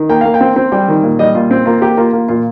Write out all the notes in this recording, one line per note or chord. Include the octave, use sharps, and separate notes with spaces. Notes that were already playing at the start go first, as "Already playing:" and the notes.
Already playing: D#3
A#3 G5
A#3 F5
G5
C4
C4
G3 G5
D#3
A#2
G3 D#5
A#2 F4
C4
A#3 F4
A#3 G4
A#3 F4
A#3
A#2 F4